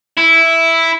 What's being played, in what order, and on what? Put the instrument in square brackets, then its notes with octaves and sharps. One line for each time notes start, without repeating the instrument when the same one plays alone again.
[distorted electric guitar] E4